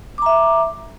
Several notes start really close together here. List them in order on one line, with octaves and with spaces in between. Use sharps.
D6 A#5 E5